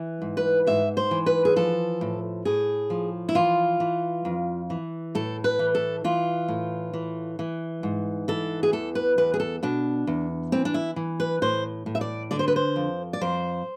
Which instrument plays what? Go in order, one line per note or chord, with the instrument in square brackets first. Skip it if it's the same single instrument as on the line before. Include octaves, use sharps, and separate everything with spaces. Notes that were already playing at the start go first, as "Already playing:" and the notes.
Already playing: [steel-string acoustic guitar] E3
G#2
B4
G#2 E5
C5
E3
B4
G#4
F3 A4
A2
A2 G#4
F3
E4
E3 F4
E3
F2
E3
A2 A4
B4
E3
A4
E3 F4
A2
E3
E3
G#2
E3 A4
G#4
E2 A4
B4
E2 B4
G#4
A4
B2 D4
E2
E3 C4
D4
E4
E3
B4
A2 C5
A2
E5
D5
D3 D5
C5
B4
C5
F2
D5
F2 C5